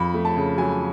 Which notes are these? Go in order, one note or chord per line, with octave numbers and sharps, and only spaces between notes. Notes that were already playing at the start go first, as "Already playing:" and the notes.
Already playing: F2 B5
A3
A5
C#3
F#3 G#5